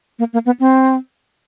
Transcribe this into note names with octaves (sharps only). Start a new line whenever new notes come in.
A#3
A#3
B3
C4